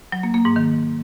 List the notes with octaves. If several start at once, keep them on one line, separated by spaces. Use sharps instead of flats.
F#3
A#3
A#3
G#2
D#3